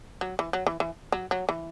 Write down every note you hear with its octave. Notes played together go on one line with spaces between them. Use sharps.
F#3
E3
F#3
E3
E3
F#3
F#3
E3